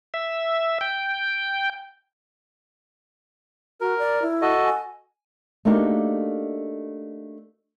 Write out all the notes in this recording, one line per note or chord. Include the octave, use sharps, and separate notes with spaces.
E5
G5
F#4 A#4
D5
E4
F#4 A4 D#5
G#5
A3 A#3 D4 D#4 F#4 G4